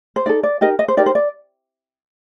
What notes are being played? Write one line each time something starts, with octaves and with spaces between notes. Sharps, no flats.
C5
D#4 A4 D5
D5
D#4 G4 A#4 D#5
D#5
C5
D#4 G4 A#4 D5
C5
D5